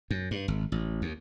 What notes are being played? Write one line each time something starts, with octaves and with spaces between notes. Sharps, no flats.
F#2
G2
G#1
A1
D#2